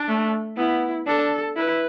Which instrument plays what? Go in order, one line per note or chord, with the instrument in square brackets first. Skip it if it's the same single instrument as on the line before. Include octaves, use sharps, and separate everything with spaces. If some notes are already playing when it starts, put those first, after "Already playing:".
Already playing: [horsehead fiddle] D4
[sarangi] A3
[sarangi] B3 [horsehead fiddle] E4
[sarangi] D4 [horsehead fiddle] A4
[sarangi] E4 [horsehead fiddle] B4